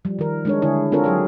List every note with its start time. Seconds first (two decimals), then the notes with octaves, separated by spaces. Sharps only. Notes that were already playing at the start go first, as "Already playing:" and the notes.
0.05 F3 G3
0.19 D#3 A#4
0.45 G#3 D4 C#5
0.62 D3 E4 G#4 C#5
0.92 C4 D4 F4 A4 A#4 C#5
1.04 F#3 G#4 C#5